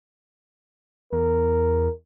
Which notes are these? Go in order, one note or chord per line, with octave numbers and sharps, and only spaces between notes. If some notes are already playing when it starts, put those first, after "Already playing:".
E2 A#4